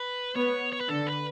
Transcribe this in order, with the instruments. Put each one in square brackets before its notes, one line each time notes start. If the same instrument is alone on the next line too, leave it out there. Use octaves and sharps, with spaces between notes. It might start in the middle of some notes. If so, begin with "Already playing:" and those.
Already playing: [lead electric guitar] B4
[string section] B3 [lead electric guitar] C#5
[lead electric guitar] C#5
B4
[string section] D3 [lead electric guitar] A4
[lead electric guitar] B4